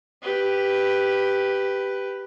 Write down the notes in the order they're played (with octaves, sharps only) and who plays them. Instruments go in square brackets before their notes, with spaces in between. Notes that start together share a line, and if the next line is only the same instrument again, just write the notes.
[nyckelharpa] G4 B4